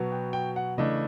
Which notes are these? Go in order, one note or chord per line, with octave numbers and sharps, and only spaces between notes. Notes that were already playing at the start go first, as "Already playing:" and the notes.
Already playing: B2 F#3 B3
G5
G5
F#5
C#3 E3 A3 D4 D#5